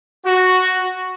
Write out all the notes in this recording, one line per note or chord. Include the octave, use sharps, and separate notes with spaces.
F#4